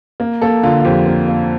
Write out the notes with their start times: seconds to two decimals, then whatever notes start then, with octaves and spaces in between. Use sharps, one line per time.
0.20 A#3
0.42 A#3 A4
0.63 D3 F4
0.80 F4
0.85 F2 G4
1.07 A#3
1.28 A#3